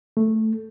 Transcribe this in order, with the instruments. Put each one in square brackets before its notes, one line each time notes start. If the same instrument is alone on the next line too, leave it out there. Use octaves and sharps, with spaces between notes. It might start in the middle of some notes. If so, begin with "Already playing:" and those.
[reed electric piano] A3